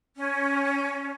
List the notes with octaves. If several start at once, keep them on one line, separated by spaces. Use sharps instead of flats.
C#4